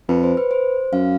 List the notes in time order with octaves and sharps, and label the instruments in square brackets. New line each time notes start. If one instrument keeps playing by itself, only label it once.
[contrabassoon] F2 [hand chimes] B4
[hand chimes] C5
B4
C5
[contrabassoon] F#2 [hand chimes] F5